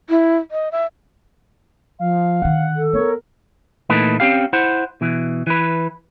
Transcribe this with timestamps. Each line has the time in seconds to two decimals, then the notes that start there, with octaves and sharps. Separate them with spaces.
0.10 E4
0.51 D#5
0.72 E5
1.99 F3 F5
2.42 D3 D#3 F#5
2.76 A4
2.93 B3 A#4 C#5
3.90 A#2 E3 A3 D#4 B4
4.20 C4 C#4 G4 F5
4.53 E4 C5 F#5
5.01 B2 E3
5.47 E3 B4